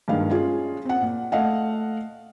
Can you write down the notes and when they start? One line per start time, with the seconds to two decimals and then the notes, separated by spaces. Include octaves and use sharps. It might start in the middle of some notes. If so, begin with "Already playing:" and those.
0.08 G2 A#2 D#3 G#3 F5
0.30 C#4 F4 G#4
0.85 C4 F#5
1.01 A#2
1.32 A3 D#5 F5 F#5